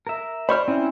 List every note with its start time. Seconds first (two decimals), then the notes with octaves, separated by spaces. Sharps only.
0.07 A#4 E5
0.49 C5 D5 B5 C#6 F6
0.68 C4 C#4 E4